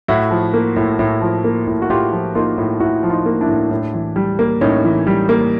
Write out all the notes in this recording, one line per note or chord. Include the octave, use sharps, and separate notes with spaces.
A2 E4 F#4
F3
A#3
A2
A2
F3
A#3
A2
F#4
A2 F4 G4
F3
A#3 D#4 F4
A2
A2 E4 F#4
F3
D#4 F4
A#3
D4 E4
A2
A2
E3
G3
A#3
A2 C#4 D#4
E3
G3
A#3